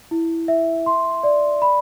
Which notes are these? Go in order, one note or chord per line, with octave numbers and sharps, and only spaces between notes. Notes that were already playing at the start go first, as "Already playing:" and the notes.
E4
E5
C6
D5
B5